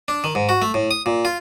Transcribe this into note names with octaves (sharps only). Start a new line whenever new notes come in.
D4
D#3
G#2
F#4
A3
A2
D#6
A#2
F4